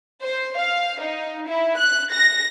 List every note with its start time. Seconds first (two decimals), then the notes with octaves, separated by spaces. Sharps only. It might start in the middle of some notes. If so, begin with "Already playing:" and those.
0.22 C5
0.58 F5
1.01 D#4
1.48 E4
1.78 F#6
2.12 A#6